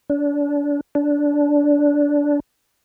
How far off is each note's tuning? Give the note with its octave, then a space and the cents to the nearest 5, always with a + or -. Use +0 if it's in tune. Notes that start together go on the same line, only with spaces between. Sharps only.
D4 -30
D4 -15